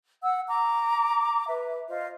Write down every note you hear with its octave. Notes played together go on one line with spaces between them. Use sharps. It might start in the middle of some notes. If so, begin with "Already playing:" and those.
F#5 E6
A#5 D6
B4 E5
F4 C5 D#5